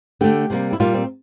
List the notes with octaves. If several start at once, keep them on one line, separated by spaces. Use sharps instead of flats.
D3 A3 G4
C3 G3 A#3
E4
A#2 G3 A#3 F4
C4